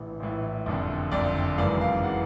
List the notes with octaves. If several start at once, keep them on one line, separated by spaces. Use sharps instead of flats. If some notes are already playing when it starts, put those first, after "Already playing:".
Already playing: A#1 A2 E3
A#1 A2 E3
F#1 F2 D3
F#1 F2 D3 D5
G#1 F#2 C#3 E3 D5
F5
C#3 E3 F#5